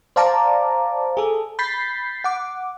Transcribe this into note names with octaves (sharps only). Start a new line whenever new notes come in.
C5 D5 F5 A5 A#5 D6
G#4 A4
B5 G6 A6 B6 C7
F#5 D6